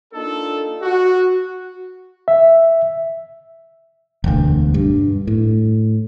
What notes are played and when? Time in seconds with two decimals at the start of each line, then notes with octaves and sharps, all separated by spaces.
0.13 A#3 D4 D#4 F4 A4
0.83 F#4
2.28 E5
4.24 E1 D2
4.74 G2
5.27 A2